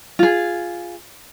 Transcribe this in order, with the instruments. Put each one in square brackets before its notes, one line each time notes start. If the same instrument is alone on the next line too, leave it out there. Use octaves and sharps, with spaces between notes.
[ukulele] F4 G#4